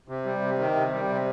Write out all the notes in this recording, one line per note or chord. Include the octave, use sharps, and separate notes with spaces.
C3
G3
C3
D#3
C3
G3
C3